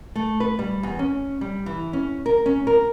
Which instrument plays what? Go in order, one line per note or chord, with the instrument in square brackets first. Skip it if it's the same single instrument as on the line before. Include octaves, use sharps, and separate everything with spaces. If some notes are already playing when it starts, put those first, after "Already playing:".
[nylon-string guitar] A3
B4
G3
E2
C#4
G3
E3
C#4
A#4
C#4
A#4